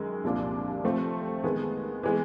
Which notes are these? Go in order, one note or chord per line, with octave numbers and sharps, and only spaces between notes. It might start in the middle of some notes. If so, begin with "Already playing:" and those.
Already playing: F#2 D#3 G#3
C2 A#2 F3 A#3 D4
F3 A3 C4
D#3 G#3 B3
E3 G#3 B3